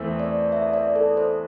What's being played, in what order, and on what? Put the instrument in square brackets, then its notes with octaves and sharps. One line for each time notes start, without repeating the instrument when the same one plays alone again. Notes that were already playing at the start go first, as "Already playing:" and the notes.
Already playing: [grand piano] E2 E3 A3 C4
[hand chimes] D5
E5
D5
A4
C5